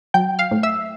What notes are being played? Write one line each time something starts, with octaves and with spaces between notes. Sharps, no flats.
F#3 G5 G6
F5 F6
A2
E5 E6